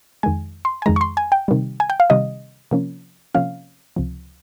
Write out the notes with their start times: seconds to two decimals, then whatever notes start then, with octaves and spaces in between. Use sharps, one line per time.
0.23 F2 D#3 G#3 G#5
0.65 C6
0.82 G#5
0.86 F2 D#3 G#3 A#5
0.96 C#6
1.01 C6
1.17 G#5
1.32 G5
1.48 C3 D#3 G3
1.80 G#5
1.90 G5
2.00 F5
2.10 C3 D#3 G3 D#5
2.71 C3 F3 A#3 C#4
3.35 C3 F3 A#3 C#4 F5
3.96 C#2 C3 F3